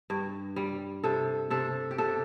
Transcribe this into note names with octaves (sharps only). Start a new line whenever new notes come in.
G2
G3
C3 A4
C3 A4
G4
C3 A4